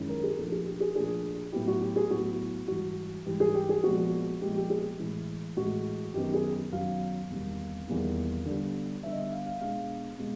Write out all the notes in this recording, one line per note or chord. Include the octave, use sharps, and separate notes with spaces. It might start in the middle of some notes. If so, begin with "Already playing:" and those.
Already playing: F#2 D#3 G#3 C#4 E4
A#4
G#4
A#2 F3 A3 D4 A4
G#4
G4
G#4
A#2 F3 A3 D4 G#4
A2 F#3 B3 E4 G4
F#4
G4
G#4
A2 F#3 B3 E4 F#4
G#2 E3 G3 F#4
G#2 E3 G3 G4
G#4
G4
G#4
A#2 F3 G#3 B3 F#4
A#2 F3 G#3 B3 G4
G4
G#4
A2 E3 G#3
A2 E3 G#3 F#4
F#2 D#3 F#3 B3 G4
G#4
F#2 D#3 F#3 B3 F5
E2 C3 D#3 G3 A#3
E2 C3 D#3 G3 A#3
D3 G3 B3
D3 G3 B3 E5
D#5
E5
F5
F5
B2 G#3 B3 D4 F5
B2 G#3